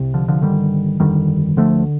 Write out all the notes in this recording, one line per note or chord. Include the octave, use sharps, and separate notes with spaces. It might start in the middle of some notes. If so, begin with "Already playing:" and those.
Already playing: C2 C3
D3 F3
D3 F3
G1 G2 D3 D#3 G3
G1 F2 D3 D#3 G3
D2 D3 F3 A3